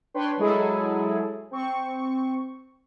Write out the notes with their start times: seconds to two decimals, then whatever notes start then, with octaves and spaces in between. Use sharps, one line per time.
0.14 D4 B4 C#5 G5 C6
0.37 F#3 G#3 E4 G#4 A4
1.51 C4 C#6